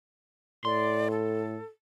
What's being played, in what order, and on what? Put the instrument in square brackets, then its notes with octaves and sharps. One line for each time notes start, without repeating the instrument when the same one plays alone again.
[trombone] A2 [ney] D5 [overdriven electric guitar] C6
[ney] A4